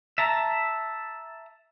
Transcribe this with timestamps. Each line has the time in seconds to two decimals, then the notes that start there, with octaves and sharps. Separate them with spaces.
0.18 E5 A5 A#5